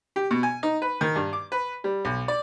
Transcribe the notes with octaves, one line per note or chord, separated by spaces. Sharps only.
G4
B2
G#5
D#4
B4
D#3
G2
D6
B4
G3
B1
D5